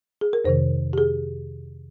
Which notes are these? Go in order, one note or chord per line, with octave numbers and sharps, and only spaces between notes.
G#4
A#4
F2 C3 D#3 C5
G4
G#4